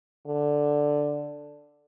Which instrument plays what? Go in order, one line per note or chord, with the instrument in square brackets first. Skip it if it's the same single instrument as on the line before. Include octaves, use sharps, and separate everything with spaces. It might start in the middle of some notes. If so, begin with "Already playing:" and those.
[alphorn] D3